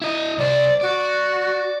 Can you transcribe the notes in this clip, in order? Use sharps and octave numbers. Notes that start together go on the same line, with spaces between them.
E4 D#5
C2 C5 D5
F#4 D5